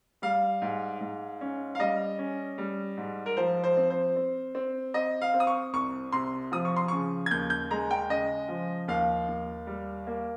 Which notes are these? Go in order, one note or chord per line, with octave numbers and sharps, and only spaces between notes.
G3 F5
G#2
G#2
C#4
F5
G3 D#5
C#4
G3
G#2
A#4
F3 C5
C5
C4
C5
C4
C4
C4 D#5
F5
C4
D#6
C#6
C2 C#6
C3 C6
F3 D#6
C#6
C6
C#3 C#6
G#6
D#2 G6
G6
G#3 A#5
G5
C#3 D#5
F3
D#2 F5
D#2
G3
A#3